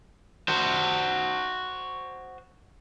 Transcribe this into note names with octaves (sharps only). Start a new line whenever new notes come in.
F#4 C5